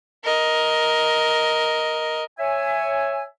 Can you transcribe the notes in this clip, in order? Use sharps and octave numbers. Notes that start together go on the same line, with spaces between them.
A#4 D#5
C#5 E5 G#5